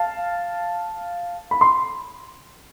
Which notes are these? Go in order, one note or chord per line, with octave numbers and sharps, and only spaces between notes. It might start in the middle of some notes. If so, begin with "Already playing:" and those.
Already playing: F5 A5
B5
C6